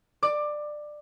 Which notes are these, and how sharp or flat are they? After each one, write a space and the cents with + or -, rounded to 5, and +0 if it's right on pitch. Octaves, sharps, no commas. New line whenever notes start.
D5 +20 D6 +15